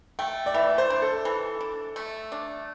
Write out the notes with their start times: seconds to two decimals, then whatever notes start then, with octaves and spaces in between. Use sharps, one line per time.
0.19 A3 G5
0.46 D5
0.54 E3 E5
0.78 C5
0.90 D4
1.02 A4
1.25 E3
1.61 D4
1.96 A3
2.32 D4